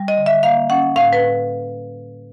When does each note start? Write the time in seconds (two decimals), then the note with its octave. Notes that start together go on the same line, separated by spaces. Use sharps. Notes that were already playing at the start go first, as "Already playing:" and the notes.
Already playing: G3
0.08 D#5
0.17 D3
0.26 E5
0.43 A#3 F5
0.70 C#4 F#5
0.96 A2 F5
1.13 B4
1.22 A2